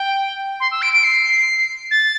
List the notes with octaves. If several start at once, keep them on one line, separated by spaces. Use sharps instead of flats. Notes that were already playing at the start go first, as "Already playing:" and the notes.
Already playing: G5
C6
E6
D7
D7
C7
A6